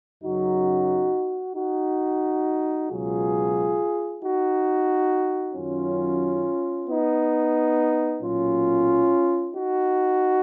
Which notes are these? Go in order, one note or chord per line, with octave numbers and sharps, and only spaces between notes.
F#2 C#3 F#3 D#4 F#4
D#4 F#4
C#2 B2 F#3 F4 G#4
D#4 F#4
F#2 D#3 F#3 C#4 F4
B3 D#4
B1 A#2 F#3 C#4 F4
D#4 F#4